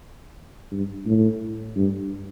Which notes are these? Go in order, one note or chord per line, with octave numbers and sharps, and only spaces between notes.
G2
A2
G2